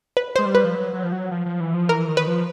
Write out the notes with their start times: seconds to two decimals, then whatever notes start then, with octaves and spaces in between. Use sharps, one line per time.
0.17 B4
0.36 G#3 C5
0.46 G3
0.55 B4
0.64 F3
0.75 F#3
0.93 F#3
1.03 F3
1.12 F#3
1.31 F3
1.46 F3
1.60 E3
1.74 F3
1.89 E3 A#4
2.08 D#3
2.17 B4
2.27 F3